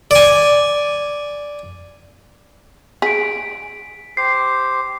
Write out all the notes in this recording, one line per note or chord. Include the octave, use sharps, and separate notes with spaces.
D5 G#5
G#4 B6 D7
G4 C5 C7